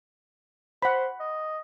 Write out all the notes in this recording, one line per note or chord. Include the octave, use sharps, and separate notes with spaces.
C5 F#5 B5
D#5